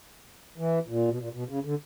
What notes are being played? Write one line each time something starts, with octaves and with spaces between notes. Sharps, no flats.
E3
A#2
B2
A#2
B2
C#3
D3